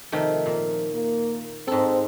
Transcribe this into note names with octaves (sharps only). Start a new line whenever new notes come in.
C3 D#3 F3 A3
A#2
A#3
G#2 C4 A4